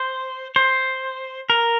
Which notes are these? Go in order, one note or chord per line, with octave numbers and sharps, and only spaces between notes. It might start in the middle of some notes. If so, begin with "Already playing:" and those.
Already playing: C5
C5
A#4